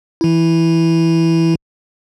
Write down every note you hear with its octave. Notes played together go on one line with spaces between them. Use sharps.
E3 E4